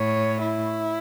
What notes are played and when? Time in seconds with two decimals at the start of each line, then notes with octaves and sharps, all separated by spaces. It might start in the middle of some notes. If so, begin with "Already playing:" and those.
Already playing: A2 C#5
0.42 E4